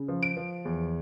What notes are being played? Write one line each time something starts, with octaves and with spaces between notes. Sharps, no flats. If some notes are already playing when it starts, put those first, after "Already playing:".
Already playing: C#3
F3
D7
F3
E2